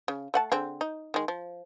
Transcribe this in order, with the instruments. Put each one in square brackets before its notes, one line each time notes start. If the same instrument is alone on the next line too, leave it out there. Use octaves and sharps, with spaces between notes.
[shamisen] C#3
A3 F#5 A5
D3 C4 G#4
D#4
D#3 G#3
F3